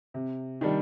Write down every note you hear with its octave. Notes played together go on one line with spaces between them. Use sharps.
C3
D#3 G3 D4